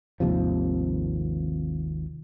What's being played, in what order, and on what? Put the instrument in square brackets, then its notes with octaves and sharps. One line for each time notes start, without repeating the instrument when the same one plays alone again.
[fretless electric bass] G#1 D#2 C3 F3